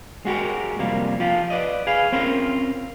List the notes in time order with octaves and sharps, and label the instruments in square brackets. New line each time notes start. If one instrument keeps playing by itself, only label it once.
[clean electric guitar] G#3 F#4 G4 A#4
F2 C3 G3 A#3
F3 F4 G4
B4 D5 D#5
G#4 B4 F5
C4 C#4 F4 A#4 C5